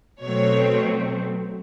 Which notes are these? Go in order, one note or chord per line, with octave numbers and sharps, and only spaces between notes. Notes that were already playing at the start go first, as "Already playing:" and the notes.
B2 F#3 A3 C4 C#5